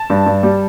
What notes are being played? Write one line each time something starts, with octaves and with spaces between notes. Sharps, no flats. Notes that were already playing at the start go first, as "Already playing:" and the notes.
Already playing: A5
G2
G2
G3